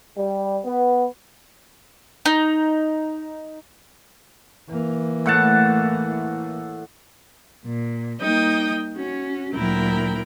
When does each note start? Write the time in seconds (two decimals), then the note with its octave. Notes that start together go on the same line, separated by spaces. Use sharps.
0.18 G3
0.66 B3
2.25 D#4
4.70 E3 A#3
5.26 A2 F#5 A5
7.64 A#2
8.21 G3 A#3 D#4 G5 D#6
8.94 C#4 F#4
9.54 D2 A#2 F#3 E4 A#4 G5